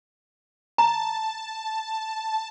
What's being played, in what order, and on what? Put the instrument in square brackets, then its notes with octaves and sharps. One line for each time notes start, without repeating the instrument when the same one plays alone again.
[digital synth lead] A5 [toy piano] A#5